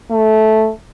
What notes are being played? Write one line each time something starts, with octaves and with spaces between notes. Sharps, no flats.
A3